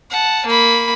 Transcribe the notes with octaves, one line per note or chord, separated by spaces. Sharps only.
F#5 A5
A#3 B5